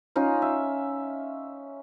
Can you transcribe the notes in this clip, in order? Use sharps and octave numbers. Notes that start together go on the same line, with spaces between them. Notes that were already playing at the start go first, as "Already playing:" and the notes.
C#4 D#4 F4
E5